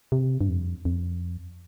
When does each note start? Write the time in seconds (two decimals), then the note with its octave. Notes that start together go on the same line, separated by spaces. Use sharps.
0.12 C3
0.41 G2
0.49 F2
0.85 F2